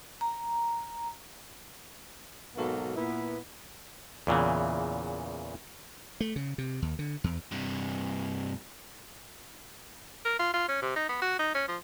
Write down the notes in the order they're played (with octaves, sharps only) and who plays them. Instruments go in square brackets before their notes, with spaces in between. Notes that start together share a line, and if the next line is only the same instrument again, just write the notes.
[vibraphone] A#5
[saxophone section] G#2 B2 F#3 A#3 B3 A4
A#2 B3 E4
[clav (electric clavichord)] E2 A#2 C#3 E3
[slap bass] A3
C#3
C3
D#2
D3
E2
[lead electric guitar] G2 C3
[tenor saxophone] A#4
F4
F4
C#4
C3
D#4
B3
F#4
D#4
C#4
F3